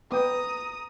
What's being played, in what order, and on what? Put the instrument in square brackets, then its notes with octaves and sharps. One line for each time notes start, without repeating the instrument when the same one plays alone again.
[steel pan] B3 G5 [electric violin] A#5 D#6